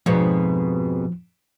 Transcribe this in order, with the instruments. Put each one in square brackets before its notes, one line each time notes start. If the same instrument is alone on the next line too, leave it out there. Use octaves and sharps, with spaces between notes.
[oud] F2 G#2 B2 [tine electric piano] F3